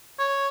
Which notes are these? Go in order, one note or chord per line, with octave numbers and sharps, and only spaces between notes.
C#5